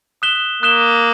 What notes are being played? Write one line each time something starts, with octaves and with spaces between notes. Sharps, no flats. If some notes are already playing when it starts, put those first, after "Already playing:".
D#6 F#6 B6 E7 G7
A#3 D#6 F#6 B6 E7 G7